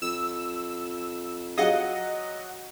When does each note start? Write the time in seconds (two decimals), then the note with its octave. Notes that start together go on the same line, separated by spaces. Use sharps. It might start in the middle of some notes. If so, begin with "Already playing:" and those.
0.02 F2 E6
1.57 F#3 F#4 G#4 D#5 F5 F#5